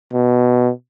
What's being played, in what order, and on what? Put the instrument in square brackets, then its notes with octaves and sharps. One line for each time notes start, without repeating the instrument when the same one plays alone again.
[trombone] B2